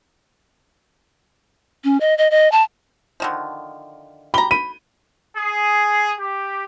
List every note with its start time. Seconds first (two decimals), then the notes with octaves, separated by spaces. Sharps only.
1.84 C#4
2.01 D#5
2.18 D#5
2.31 D#5
2.52 A5
3.20 D3 D#3 F3
4.34 G4 A#5 B5 G7
4.51 B5 D#7
5.36 G#4
6.19 G4